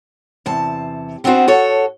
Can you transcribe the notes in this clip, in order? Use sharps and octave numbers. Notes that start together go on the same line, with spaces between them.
E2 C3 A5
B3 C4 D4 D#4 F#4 C5
F#4 A4 C#5